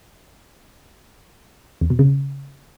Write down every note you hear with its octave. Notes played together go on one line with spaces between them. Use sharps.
E2
B2
C#3